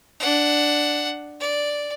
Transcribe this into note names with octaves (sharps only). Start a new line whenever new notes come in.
D4 F#5
D5